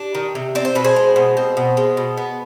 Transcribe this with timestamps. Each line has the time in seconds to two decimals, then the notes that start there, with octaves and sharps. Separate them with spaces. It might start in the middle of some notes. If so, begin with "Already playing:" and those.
Already playing: D4 G4
0.15 D#3
0.35 C3
0.55 C4 D5
0.65 C5
0.75 B2 B4
0.84 G#4 C5
0.96 G#3
1.16 B2
1.37 C4
1.57 B2
1.77 G#3
1.97 B2
2.17 B3